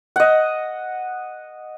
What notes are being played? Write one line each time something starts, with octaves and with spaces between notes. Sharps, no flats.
D#5 F#5